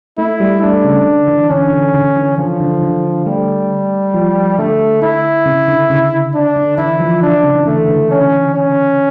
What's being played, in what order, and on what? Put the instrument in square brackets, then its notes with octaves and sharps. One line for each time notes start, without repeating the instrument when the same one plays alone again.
[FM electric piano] A3 [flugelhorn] E4
[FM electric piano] G3
[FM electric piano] A3 [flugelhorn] D4
[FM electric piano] C#3
D3
E3
[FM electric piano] D3 [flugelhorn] C#4
[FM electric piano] D3
D3
E3
[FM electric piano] D3 [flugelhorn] F3
[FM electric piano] D3
D3
[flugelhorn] G3 [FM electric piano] A3
[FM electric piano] F3
[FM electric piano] D3 [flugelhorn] A3
[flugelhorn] E4
[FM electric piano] C#3
D3
C#3
[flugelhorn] D4
[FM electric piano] D3
[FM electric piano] E3 [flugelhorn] E4
[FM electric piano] F3
[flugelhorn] D4
[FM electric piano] C#3
E3
[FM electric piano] D3 [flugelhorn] A3
[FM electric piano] E3
[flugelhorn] C#4
C#4